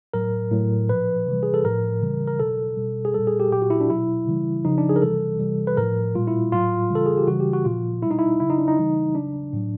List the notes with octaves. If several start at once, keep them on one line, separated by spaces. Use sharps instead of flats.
A2 F#3 A#4
A2 F#3
A#2 F3 B4
C3 E3 G3
G#4
A4
A2 F3 A#4
C#3 E3 G3
A#4
B2 F#3 A4
B2 G3
G#4
A#2 G3 A4
G#4
G4
A#2 F#3 G4
F#4
E4
D4
B2 F#3 E4
C#3 E3 G3
C#3 F3 D#4
D4
G#4
A#4
C3 E3 G3 A4
C3 E3 G3
B4
A2 F3 A#4
A#2 G3 F4
E4
A2 F#3 F4
C#3 E3 G3
A4
G#4
G4
C#3 E3 G3 F#4
G4
F#4
A#2 F3 F4
B2 G3 E4
D#4
E4
C#3 F#3 E4
D#4
D4
D#4
C#3 E3 G3
C#3 F#3 D4
A2 F#3